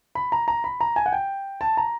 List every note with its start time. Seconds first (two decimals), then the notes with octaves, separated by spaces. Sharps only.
0.15 B5
0.32 A#5
0.48 A#5
0.64 B5
0.81 A#5
0.96 G#5
1.06 F#5
1.13 G5
1.61 A5
1.77 A#5